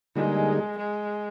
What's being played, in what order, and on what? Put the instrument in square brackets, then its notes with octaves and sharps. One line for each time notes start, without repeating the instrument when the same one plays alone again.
[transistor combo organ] D3 G3 A#3 D#4 G#4 [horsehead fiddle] G#3
[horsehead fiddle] G#3